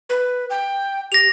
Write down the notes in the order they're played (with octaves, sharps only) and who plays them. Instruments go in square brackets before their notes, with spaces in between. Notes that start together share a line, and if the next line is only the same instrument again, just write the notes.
[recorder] B4
G5
[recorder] G4 [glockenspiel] A#6 F7